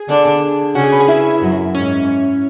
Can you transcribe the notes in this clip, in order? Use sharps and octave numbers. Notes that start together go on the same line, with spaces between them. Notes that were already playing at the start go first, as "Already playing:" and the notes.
Already playing: G#4 G#5
D3 D4
C#3 C#4 F#4 F#5
G#4 G#5
B4 B5
G#4 G#5
E4 E5
F#2 F#3
G#2 C#4 C#5